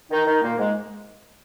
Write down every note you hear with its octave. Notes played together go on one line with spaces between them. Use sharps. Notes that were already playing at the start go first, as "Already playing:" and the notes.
D#3 D#4
D#3 D#4
A#2 A#3
G#2 G#3